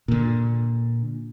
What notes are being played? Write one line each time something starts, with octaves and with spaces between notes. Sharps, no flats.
A#2 D3